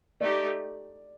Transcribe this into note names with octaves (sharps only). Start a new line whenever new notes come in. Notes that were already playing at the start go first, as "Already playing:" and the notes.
A3 D#4 G4 D5